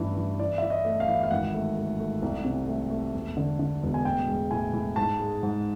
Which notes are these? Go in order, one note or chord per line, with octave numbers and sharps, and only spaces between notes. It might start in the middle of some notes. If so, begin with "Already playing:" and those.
Already playing: A1 G2 E3
E3
E3 D5
E3 E5
D#5
A3
F5
E3
F5
G#1 F#5
A3
A3
A3
C2
C3
A3
A3
E1
D3
D3
E1
G#5
A2 G5
G#3
A2 G#5
A2
G#2 A5
G#3
G#2